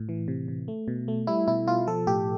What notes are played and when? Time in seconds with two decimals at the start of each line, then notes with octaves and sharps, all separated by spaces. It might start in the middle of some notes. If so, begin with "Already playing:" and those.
Already playing: A2
0.09 E3
0.28 C3
0.48 C3
0.68 A3
0.88 B2
1.08 A3
1.27 G3 E4
1.47 B2 E4
1.67 B2 F4
1.87 F3 A4
2.07 A2 G4